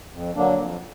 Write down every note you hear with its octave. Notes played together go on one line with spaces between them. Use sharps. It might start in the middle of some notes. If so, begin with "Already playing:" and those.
F2
D3 F#3 A#3 D4
F2